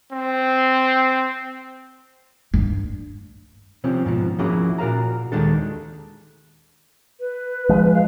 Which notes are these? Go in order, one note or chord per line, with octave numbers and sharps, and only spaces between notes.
C4
G2
C3 F3 C4 C#4
G#2 B2 F3
F3 A#3 C#4 E4 F#4 G#4
A#2 F#4 A#4 F5 A#5
D#2 D#3 G#3 D4 A4
B4
F3 G#3
F5